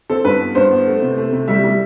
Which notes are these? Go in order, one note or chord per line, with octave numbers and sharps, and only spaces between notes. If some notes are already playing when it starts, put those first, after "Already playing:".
C4 A4
G2 B4
B3
G2 C5
B3
A3
C3
A3
C3
G3 E5
G3